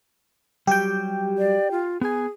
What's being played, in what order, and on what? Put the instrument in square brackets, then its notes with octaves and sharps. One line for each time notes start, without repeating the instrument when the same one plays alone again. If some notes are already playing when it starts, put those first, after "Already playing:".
[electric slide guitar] F#3 G3 [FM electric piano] G4 G5
[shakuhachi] D5
F4
[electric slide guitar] B3 G#5 [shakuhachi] G#4